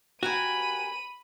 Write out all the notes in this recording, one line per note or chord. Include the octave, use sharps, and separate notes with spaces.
F#4 G4 A#4 G#5 B5 D#7